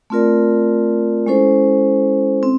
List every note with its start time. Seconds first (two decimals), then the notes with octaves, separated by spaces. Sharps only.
0.10 A3 C4 F4 A#4 D5
1.26 G#3 C#4 E4 A4 C5
2.43 C4